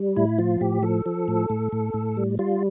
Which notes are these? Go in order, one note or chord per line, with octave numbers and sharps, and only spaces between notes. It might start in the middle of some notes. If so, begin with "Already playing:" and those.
Already playing: G3
A2 E4
F3 F4
A2 G4
F3 A4
F3
A2
A2
A2
A2
G3
G3 F4